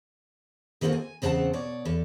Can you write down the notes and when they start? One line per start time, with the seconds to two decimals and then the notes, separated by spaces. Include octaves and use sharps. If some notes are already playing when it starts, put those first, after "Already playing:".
0.81 D#3 G3 A#3 C4 F#4 A4
0.92 G#5
1.22 E2 C#3 C4 A4 F#5 A5
1.53 B2 C#5 D5
1.85 E2 A4